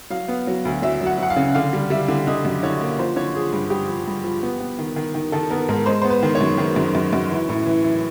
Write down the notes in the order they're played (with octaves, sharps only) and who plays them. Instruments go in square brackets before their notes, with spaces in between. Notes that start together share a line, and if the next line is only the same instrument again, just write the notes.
[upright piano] F#3 F5
B3
F#3
D2
F#3 E5
F#3
F#5
F#3 F#5
F5
C#3
D3 F5
G3
G3 E5
D3
D3 D#5
F#2
D3 C#5
A#3
F3 C5
D3 C#5
F3 G#4
G2
G2 G4
F3
G2
F3
B3
B3
D#3
D#3
D#3
D#3 A4
B3 A#4
G#2 A#4
G#3 C5
B3 C5
B4
D#3
C#5
F#2
D#3
F#2
F#2
F#2
E3
A2
E3
E3